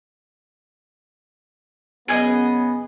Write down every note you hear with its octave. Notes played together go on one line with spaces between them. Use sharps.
F#2 C#3 B3 G#4 D#5